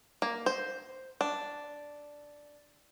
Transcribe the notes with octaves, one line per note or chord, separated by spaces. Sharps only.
A#3
C5
D4